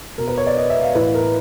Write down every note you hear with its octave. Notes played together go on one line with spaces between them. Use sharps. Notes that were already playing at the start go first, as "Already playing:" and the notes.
B2 A#4
B4
C#5
D5
D#5
E5
F5
A2 E3 B4
A#4